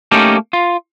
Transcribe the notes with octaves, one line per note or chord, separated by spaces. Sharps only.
A3 A#3 C#4 D#4 G4 A4
F4